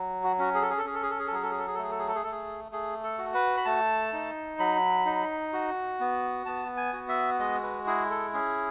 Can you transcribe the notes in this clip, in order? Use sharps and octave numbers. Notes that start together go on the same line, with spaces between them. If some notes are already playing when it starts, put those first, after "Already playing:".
Already playing: F#3
F#4
C#4 F#4
G#4
A4
G#4
A4
C#4 G#4
A4
G#4
A4
G#4
A4
F#3 G#4
A4
G#4
A4
G#4
A4
A3 G#4
A4
G#4
A4
G#4
A3 A4
G#4
A3 G#4
A4
F#4
B4
B5
A3 A5
D#4
F#3 B5
D#4
F#4
B3
B3 A5
G#5
F#4
E5
G#3 D#5
B4
E4 G#4
A4
C#4 G#4